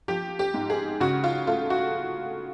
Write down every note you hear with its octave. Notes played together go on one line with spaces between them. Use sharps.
F3 G4
G4
G#2
G#4
C#3 F#4
F4
A3 F4
F#4